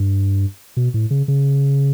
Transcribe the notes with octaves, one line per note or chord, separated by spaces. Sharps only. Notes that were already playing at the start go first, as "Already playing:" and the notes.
Already playing: G2
B2
A2
C#3
C#3